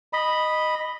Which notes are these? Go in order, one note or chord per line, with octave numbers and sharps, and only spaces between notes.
D#5 B5